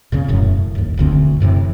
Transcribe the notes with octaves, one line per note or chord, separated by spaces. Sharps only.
E2 A#2 C#3 C#4
E1 F#2 A2
G1 D#2
E1 D2 D3 C4
F#2 A2 C3 E3